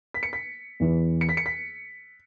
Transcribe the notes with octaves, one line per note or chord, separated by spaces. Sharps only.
B6
C#7
B6
E2 E3
C#7
B6
C#7
B6